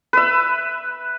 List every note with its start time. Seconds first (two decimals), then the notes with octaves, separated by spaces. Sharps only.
0.13 B4 E5